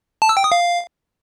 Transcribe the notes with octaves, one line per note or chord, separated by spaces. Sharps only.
A5
E6
G5
D#6
F5